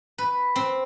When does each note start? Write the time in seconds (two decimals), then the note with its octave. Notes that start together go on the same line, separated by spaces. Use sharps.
0.18 B4
0.56 C4